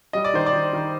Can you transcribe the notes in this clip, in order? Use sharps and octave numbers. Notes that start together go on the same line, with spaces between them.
G3 D#5
D5
D#3 C5
D5
D#3
D#3